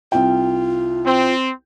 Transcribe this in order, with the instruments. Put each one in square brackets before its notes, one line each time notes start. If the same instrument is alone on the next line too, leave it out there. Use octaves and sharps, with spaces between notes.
[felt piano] C2 G5 [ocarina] F4
[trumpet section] C4